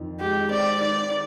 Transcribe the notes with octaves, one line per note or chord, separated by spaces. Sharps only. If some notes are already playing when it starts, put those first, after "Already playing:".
Already playing: F2 D#3
G#3 G4
C4 D5
D#3 D5